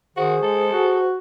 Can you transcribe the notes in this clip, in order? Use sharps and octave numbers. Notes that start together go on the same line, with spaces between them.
D#3 F#4 G#4 C5
G#3 A4
F#4